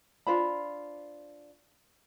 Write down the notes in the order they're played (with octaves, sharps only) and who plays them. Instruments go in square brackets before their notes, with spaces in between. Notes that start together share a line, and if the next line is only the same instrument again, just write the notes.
[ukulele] D4 F4 C5 B5